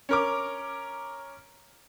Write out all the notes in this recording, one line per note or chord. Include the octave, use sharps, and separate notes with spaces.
C#4 A#4 D6